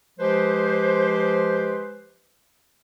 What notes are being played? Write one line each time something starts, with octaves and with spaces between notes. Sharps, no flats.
F3 G#3 G4 B4 C5